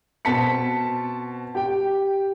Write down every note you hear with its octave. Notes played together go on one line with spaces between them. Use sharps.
B2 C4 A5 B6 C#7
G4 G5